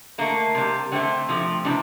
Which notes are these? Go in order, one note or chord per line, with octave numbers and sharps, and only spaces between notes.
D3 A3 A#3
C3 G3
D3 A3 C4
C3 F3 A3
C3 E3 G3 D4